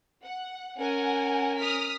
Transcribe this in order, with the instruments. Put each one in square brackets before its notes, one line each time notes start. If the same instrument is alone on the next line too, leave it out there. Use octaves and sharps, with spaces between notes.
[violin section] F#5
[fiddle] C#4 A#4 [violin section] F#5 G#5
[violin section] D#6 F6 B6